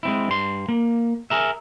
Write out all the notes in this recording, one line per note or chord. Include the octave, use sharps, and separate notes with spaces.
G#3 C4 E4
G2 C6
A#3
G#4 A#4 E5